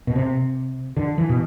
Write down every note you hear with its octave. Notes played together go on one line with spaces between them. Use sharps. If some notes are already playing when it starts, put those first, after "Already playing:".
B2
C3
D3
E3
B2